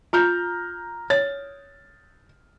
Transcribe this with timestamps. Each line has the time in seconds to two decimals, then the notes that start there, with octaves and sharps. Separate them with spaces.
0.13 F4 A#5 F6 G6
1.10 C#5 A6